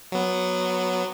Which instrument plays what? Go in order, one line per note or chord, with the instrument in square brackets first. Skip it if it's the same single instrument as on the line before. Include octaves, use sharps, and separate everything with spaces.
[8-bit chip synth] F#3 B3